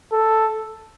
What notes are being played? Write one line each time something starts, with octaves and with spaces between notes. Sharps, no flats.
A4